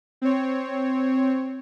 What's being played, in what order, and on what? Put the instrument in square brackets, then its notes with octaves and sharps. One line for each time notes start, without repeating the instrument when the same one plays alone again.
[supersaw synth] C4 C#5